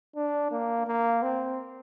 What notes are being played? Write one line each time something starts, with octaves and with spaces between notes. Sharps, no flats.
D4
A#3
A#3
C4